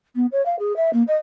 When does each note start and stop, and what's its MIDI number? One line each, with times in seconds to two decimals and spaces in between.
0.15 0.26 59
0.32 0.44 73
0.45 0.56 77
0.59 0.75 68
0.76 0.90 76
0.93 1.03 58
1.07 1.15 75